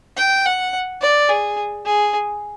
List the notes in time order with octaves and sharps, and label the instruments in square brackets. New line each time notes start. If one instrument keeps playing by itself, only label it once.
[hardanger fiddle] G5
F#5
D5
G#4
G#4